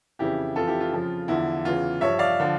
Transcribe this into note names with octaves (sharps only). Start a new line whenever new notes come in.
F2 C#3 E3 E4 G4
F2 E3 F4 A4
E4 G4
F4
F2 C#3 F3
E2 D3 F3 E4
E2 C#3 E3 F4
G2 F3 C#5 E5
D5 F5
D3 F3